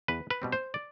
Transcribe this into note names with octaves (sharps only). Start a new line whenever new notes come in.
E2 B4
B4
B2 G3 C4
C5
D5